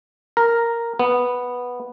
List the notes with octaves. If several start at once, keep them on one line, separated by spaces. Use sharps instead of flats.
A#4
B3